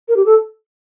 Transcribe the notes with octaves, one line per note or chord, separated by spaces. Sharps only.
A#4
G4
A4